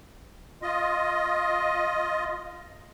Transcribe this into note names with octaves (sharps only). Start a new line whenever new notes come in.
F4 D#5